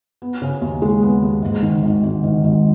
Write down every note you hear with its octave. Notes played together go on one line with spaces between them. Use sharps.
B3
C#3
D#2
G#3
B3
D#2
G#2
D#3
G#1
G#1
D#3
G#1